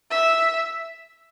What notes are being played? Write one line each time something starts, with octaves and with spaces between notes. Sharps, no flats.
E5